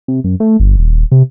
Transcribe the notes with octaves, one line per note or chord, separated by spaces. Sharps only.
C3
F#2
A3
G1
D#1
C3